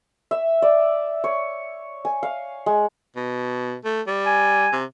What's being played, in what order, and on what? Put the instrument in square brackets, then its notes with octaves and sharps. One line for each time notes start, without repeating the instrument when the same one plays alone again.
[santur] E5
D5
C#5
G#5
F5
G#3
[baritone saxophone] B2
A3
G3
[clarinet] G#5
[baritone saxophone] C3